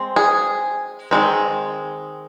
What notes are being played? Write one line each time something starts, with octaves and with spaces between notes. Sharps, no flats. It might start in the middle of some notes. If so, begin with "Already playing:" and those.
Already playing: G#3 C4
G#4
D#3 G#3 C4